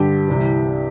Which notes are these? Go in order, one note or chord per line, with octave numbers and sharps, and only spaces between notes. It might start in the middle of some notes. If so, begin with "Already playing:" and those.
Already playing: G2 D3 G4
C2 C3 E3